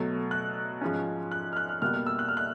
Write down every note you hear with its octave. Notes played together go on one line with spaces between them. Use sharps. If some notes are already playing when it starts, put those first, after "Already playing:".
Already playing: B2 F#3 A3
F#6
G#2 F3 G#3 C#4
F#6
F6
F#6
F6
B2 G3 A#3 F6
F6
E6
F#6
F6
F#6